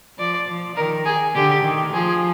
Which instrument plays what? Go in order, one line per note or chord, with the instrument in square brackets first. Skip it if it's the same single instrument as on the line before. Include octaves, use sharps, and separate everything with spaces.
[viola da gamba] F3 [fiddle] D5
[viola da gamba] F3
[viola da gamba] D#3 [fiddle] A#4
[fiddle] G#4
[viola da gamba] D3 [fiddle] G4
[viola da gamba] D#3
[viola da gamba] F3 [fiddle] G#4